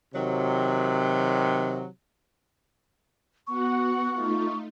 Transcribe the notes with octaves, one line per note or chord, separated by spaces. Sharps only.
C3 D#3 F#3
B3 F#4 F#5 C#6
A3 D#4 F4